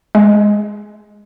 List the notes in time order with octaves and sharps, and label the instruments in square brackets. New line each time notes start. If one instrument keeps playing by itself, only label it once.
[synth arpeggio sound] G#3